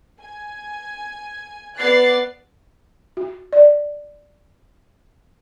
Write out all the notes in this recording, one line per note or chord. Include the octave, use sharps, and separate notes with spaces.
G#5
B3 D5 F#6 A6 C7
F#4
D5